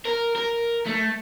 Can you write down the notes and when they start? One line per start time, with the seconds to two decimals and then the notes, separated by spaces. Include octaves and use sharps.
0.05 A#4
0.35 A#4
0.86 A3